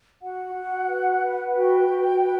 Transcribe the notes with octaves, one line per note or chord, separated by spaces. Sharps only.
F#4 F#5
F#4
B4
B4
F#4 G5
F#4
B4